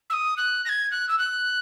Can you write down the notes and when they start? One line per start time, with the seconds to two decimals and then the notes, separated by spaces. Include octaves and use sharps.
0.10 E6
0.13 D#6
0.37 F#6
0.65 A#6
0.69 G#6
0.91 F#6
1.08 E6
1.18 F#6